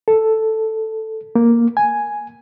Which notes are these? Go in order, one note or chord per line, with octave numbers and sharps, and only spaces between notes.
A4
A#3
G#5